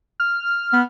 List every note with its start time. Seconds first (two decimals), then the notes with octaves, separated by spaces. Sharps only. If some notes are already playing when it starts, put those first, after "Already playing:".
0.20 F6
0.73 B3